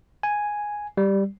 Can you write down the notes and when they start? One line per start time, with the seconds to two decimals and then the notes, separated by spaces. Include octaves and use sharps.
0.23 G#5
0.97 G3